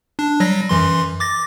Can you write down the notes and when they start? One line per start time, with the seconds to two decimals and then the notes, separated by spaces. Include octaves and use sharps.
0.19 D4
0.40 F#3 G3 A#6
0.69 F#2 E3 C6
1.20 D6 A6 A#6